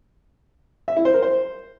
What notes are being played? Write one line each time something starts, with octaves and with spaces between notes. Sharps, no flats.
E5
E4
C5
A#4
C5